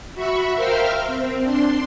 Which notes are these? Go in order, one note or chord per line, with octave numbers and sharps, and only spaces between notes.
F#4 E5 B5 C#6
A#4 C5 E5 F5 G5 F6
C4
D4 C6